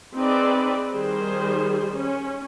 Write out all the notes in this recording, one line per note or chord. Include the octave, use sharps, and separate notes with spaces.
C4 D#4 G#4 B4 D5
D#3 G3 G#4 C5
C#4